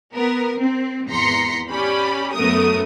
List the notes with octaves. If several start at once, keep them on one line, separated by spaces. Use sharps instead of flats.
B3 A#4
C4
G#1 E2 A#5 C6 B6 C#7
C#4 G4 D5 B5
F#2 A3 B3 A#4 D#6